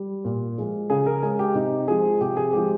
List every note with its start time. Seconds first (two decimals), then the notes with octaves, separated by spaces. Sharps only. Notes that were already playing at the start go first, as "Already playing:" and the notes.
Already playing: G3
0.25 A#2
0.58 F3 G#3
0.90 C#3 G#4
1.06 A#4
1.23 G#3 G#4
1.39 G4
1.55 C3 D#4
1.88 F3 G#3 G#4
2.21 C3 G4
2.37 G#4
2.53 F3 G#3 G4